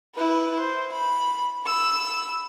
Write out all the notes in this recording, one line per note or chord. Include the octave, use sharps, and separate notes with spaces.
E4 B4
C5
B5
B5 E6